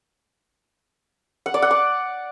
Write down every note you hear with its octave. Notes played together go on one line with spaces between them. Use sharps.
F#5
D5
F#5
D6